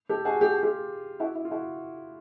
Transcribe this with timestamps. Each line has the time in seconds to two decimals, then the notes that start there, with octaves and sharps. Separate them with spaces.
0.09 G4 A4
0.25 F#4 G#4
0.41 G4
0.52 G#4
0.63 F4 G4
1.20 E4 F#4
1.35 E4
1.45 F4
1.51 E4 F#4